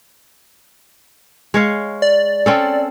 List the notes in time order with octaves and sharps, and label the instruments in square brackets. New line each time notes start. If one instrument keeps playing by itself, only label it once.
[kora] G#3 C#5 F5
[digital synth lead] D5
[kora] C4 C#4 A4